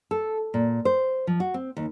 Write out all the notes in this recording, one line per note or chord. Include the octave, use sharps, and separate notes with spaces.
A4
A#2
C5
F3
F#4
C4
D#2